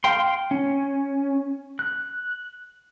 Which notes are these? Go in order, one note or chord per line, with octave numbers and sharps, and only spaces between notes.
F5 G5 C6
C#4
F#6